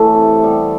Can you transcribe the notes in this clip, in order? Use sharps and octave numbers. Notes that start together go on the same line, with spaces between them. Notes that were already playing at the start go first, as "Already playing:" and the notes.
Already playing: A2 E3 A3 A4
C3
G3 B3